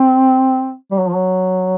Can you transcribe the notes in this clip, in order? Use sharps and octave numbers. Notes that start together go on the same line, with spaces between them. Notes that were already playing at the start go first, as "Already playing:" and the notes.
Already playing: C4
G3
F#3
F3
F#3